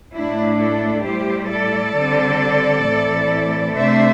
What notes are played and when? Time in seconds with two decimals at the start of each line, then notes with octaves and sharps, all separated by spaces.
0.15 A2 A3 D4 E4
0.60 E4 A4
1.05 A2 G3 E4 G4 C5
1.51 A4 D5
1.96 D3 G3 C4
2.87 A2 E3 C4 E4
3.78 C3 A3 D4 C5 E5